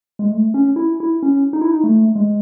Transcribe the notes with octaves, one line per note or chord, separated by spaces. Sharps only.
G#3
A3
C#4
E4
E4
C#4
D#4
E4
D#4
A3
G#3